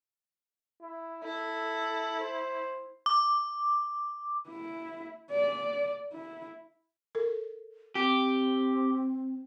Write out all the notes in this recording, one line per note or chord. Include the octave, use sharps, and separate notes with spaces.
E4
E4 A4
C5
D6
E4
D5
E4
A4 A#4
C4 G4